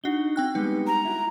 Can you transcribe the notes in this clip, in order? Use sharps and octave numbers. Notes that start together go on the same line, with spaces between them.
D4 D#4 F#4 G7
C4 G5 F#6
G3 G#3 B3 D#4
A#5
E4 F#4